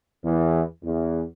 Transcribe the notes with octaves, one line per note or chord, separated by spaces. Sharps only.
E2
E2